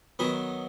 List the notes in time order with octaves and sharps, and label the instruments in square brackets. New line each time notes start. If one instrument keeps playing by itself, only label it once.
[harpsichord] D#3 F#3 B3 B4